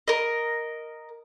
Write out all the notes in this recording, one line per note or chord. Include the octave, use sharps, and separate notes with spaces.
A#4 D#5